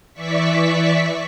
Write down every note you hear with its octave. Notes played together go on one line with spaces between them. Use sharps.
E3 D5 E5 C#6 B6